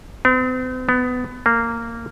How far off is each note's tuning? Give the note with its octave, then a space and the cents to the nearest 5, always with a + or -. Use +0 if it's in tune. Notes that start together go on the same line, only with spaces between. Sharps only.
C4 -40
B3 +20
A#3 -15